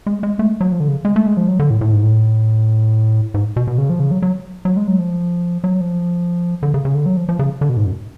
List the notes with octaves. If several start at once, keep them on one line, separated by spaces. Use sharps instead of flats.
G#3
G#3
A3
F#3
F3
D3
C#3
G#3
A3
G#3
F3
F#3
D3
A2
A2
G#2
A2
G#2
B2
B2
C#3
F3
C#3
F#3
F#3
F#3
G#3
F#3
F3
F#3
F3
D3
C#3
C#3
D3
F#3
F3
F3
C#3
D3
B2
G#2
F#2